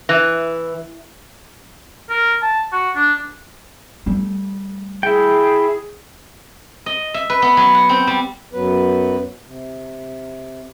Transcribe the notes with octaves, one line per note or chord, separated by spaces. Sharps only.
E3
A#4
A5
F#4
D4
G3 A3
E4 G#4 G5
D#5
E5
B4
B3
F#3
F#5
C4
G3
F#2 F#3 B3 B4
C3